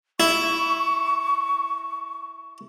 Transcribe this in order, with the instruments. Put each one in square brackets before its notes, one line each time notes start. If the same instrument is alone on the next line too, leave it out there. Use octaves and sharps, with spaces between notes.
[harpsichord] E4 [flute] C#6